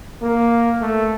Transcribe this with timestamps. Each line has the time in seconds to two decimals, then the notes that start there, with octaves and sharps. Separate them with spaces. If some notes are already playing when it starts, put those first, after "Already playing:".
0.22 A#3
0.81 A3